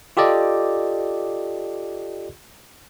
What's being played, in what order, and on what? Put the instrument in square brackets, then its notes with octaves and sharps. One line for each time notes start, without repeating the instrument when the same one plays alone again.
[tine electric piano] F4 G4 A4 D5 D#5